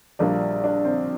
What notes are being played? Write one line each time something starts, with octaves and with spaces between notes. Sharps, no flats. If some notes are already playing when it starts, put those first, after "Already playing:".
A#1 A#2 G3 A#3 D4
D4
C4